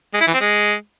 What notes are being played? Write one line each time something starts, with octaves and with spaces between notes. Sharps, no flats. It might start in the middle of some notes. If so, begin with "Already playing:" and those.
G#3
E4
E3
C4
G#3